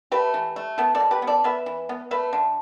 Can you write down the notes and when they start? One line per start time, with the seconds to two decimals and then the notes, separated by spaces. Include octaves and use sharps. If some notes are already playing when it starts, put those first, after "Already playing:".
0.12 A3 G4 B4
0.34 E3
0.56 A3
0.78 B3 E4 A4
0.95 A4 D5
1.00 B2
1.11 G4 B4
1.22 B3
1.27 A4 D5
1.44 B3 B4 E5
1.66 E3
1.89 B3
2.11 A3 B4 E5
2.33 D3